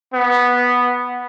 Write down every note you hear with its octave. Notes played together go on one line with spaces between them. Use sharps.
B3